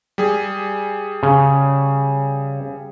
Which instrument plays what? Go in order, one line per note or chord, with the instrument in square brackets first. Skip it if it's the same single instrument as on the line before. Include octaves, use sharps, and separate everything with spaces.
[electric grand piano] G3 G#4
[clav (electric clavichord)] C#3